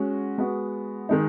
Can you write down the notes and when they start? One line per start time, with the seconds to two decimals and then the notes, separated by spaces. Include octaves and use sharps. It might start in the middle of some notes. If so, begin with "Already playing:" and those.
Already playing: G#3 C#4 F#4
0.38 G#3 B3 F#4
1.09 D#3 G#3 D#4